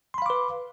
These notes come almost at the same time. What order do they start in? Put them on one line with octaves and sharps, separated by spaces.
C6 B5 F5 D6 B4